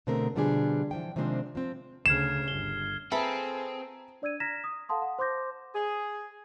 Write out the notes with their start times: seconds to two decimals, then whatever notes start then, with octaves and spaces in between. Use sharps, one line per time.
0.07 B2 D3 A3 C4 G#4 A#4
0.36 B2 D3 F3 G3 D4 G#4
0.91 E3 F3 G5
1.16 C3 D#3 F3 G#3 C4 D4
1.55 F3 C4
2.06 D2 C#3 F6 G#6 C7 E7
2.48 G1 G7
3.12 C4 F4 G#4 A4 B4 E5 A#5 B5
4.22 D4 D5 E6 G#6 D#7
4.40 A#5 F6 G#6 A#6 B6 E7
4.64 D#6
4.89 A4 F5 F#5 A5 C6 D#6
5.02 F#5
5.19 C5 C6 D6 G6 A#6
5.75 G#4